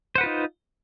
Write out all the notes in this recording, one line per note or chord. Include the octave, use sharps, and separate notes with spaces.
D#4 F4 B4 C5 F#5